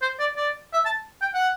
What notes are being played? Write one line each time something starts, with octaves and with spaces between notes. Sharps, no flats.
C5
D5
D5
E5
A5
G5
F#5